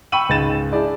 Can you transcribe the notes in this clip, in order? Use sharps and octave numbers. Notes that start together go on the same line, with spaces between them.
G5 B5 C#6 E6 D#7 F#7
C#2 G#2 A6 E7
D4 E4 G#4 D5